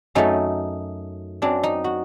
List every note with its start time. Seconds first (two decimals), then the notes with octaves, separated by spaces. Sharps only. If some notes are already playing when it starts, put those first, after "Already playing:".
0.15 F#2 F#3 A3 D#4
1.42 F#2 F#3 C4 D4
1.63 D#4
1.84 F#4